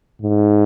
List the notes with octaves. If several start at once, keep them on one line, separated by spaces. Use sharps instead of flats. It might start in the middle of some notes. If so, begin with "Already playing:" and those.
G#2